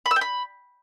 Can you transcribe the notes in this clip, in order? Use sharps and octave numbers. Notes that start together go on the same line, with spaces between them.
B5
E6
G5
B5